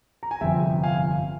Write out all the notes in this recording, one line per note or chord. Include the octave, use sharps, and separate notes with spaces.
A#5
G#5
G1 F2 C3 F3 E5 G5
F5 G#5